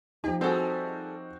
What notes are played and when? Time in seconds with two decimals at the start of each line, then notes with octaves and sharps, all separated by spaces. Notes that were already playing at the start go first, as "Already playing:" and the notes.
0.24 F3 D#4 G4
0.41 G3 C4 F#4 G#4 A4